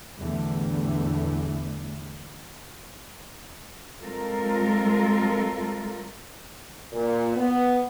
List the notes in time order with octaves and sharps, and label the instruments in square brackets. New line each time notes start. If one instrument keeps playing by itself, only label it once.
[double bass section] E2 A2 D3 E3 G3 A3
[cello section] G3 G#3 C4 F4 A4 A#4
[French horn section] A#2
B3